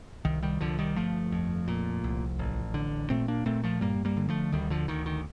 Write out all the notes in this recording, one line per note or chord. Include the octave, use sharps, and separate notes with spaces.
C2 D#3
D#3 G3
C2 D3 F3
D#3 G3
G1 F3 A3
F2
A#2
C2
A1
D3
A#2 A3 C4
A#3 D4
A#2 A3 C4
F3 A3
G2 G3 A#3
G3 A#3
D3
F3 A3
D2 D#3 G3
D3 F3
D2 D#3
D#3